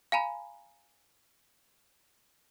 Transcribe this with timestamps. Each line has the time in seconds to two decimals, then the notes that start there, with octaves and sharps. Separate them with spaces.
0.12 F5 G#5 A#5 B5